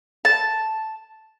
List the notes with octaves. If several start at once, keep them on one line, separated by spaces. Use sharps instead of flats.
A5